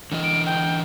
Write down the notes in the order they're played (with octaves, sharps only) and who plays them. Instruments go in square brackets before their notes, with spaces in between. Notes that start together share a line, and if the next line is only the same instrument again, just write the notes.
[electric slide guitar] D3 E3 D#5
[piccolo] D7
G5